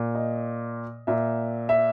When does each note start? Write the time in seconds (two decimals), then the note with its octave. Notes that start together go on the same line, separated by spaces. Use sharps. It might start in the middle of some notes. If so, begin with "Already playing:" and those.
Already playing: A#2
0.15 D#5
1.07 A#2 E5
1.69 E5